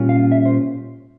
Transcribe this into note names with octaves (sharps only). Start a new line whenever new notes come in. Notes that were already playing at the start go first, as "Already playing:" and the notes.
Already playing: A#2 G3 C#4 F4
F5
E5
C5